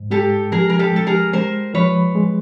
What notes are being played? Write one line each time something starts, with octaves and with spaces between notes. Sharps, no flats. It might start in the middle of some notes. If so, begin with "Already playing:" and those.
Already playing: G#2
G#3 G4 A4
F3 G#4 A#4
A#4
G4 A4
G#3 A4
G#4 A#4
G#3 A#4 C5
F3 B4 C#5
G#3